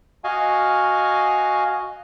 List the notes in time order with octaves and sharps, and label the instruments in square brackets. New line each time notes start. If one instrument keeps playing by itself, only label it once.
[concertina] F#4 D#5 F5 G#5